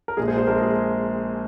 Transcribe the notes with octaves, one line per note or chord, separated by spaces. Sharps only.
A#4
A#1 A#2 G#3 G#4
G#4 C5
G#4 C5
A#1 A#2 G#3 A#4
G#4